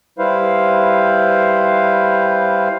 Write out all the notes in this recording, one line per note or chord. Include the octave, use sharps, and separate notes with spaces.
G3 E4 B4 C5 F5